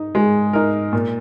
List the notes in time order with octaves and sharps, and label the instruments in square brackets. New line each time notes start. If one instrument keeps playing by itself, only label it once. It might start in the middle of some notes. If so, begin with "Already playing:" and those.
Already playing: [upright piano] D#4
G#3
D#4 A#4
A#2